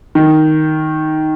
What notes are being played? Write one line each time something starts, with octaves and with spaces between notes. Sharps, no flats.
D#3